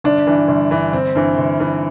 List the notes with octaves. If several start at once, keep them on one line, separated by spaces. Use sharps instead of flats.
G1 D4
G2 E3
G1
G2 E3
G1 C4
G2 E3
G1
G2 E3